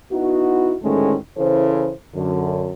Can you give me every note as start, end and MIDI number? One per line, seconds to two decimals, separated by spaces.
0.12 0.74 59
0.12 0.74 63
0.12 0.74 64
0.12 0.74 66
0.82 1.16 38
0.82 1.16 45
0.82 1.16 51
0.82 1.16 56
0.82 1.16 57
0.82 1.16 61
1.37 1.91 49
1.37 1.91 52
1.37 1.91 64
1.37 1.91 69
1.37 1.91 72
2.15 2.72 42
2.15 2.72 50